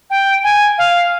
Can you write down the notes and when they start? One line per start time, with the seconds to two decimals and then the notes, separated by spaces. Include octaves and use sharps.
0.10 G5
0.44 G#5
0.78 F5